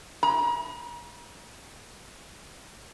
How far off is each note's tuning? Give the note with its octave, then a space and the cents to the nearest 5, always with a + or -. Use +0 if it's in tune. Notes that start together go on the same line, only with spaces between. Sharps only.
A#5 +40